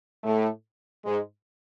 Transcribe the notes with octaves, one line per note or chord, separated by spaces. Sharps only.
A2 A3
G#2 G#3